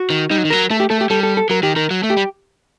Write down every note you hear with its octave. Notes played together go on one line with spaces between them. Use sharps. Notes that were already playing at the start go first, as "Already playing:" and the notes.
Already playing: F#4
D#3
G3 D#4
F#3
D#3
F#3 A#4
A3 A4
G4
A3 A4
G4
G3 A4
A4
A4
F#3 A#4
D#3 G4
D#3 A#4
F#3
A3
G4
G3